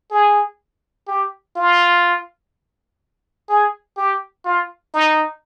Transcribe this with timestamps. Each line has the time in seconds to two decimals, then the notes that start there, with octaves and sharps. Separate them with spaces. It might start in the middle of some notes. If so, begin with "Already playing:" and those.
0.11 G#4
1.07 G4
1.56 F4
3.49 G#4
3.97 G4
4.45 F4
4.94 D#4